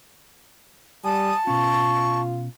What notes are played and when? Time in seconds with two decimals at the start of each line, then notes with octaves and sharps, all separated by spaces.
1.05 G3 G#5 A5 D#6
1.47 B2 C#4 F4 C#6